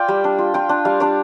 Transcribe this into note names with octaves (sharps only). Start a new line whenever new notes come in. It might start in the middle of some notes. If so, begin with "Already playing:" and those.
Already playing: F4 D5 F5 G5
G3
D4
F4
F4 G5
D4
G3 F5
D4 D5